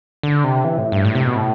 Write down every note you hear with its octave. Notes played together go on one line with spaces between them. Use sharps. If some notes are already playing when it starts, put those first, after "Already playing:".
D3
C3
E3
A2
G2
A2
C3
B2
A2